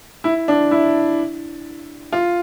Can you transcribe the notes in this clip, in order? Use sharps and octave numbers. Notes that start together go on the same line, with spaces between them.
E4
D4
E4
F4